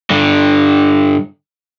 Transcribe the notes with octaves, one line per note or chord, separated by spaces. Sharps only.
G2 D3